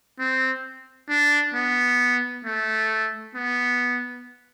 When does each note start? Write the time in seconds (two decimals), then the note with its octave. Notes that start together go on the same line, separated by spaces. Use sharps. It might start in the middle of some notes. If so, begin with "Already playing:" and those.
0.20 C4
1.10 D4
1.54 B3
2.45 A3
3.35 B3